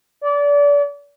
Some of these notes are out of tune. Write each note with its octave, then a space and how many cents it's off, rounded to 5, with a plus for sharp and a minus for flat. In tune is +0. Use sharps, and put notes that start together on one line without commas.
D5 -30